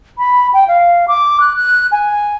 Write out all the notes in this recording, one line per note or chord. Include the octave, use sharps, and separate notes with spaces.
B5
G5
F5
D6
F#6
F#6
G#5